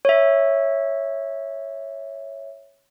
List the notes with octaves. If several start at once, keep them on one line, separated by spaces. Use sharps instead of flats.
C#5 E5